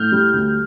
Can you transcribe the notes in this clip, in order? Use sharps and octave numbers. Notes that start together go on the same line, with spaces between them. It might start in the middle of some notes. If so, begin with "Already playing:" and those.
Already playing: A2 F6 G6
G3
D2